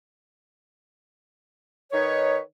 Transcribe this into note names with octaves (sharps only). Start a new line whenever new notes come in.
D#3 D#4 B4 C#5